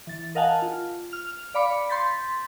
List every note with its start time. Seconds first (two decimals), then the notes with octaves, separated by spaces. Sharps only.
0.07 E3 A6
0.35 A#4 D#5 F5 F#5 G#5 A5
0.62 F4
1.12 F6 F7
1.54 D5 F5 B5 D6 C#7
1.89 C6 G6 A6 B6